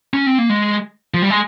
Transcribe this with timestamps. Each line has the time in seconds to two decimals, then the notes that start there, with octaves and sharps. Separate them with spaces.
0.14 C#4
0.26 C4
0.38 A#3
0.49 G#3
1.14 F3
1.22 G3
1.30 G#3